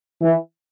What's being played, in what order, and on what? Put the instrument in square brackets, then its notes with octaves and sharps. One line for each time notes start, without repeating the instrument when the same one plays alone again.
[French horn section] E3